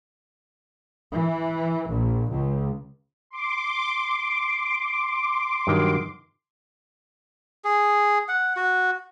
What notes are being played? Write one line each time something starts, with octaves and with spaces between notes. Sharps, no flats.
E3
A#1
C#2
C6 D6
G2 D#3 F#3
G#4
F#5
F#4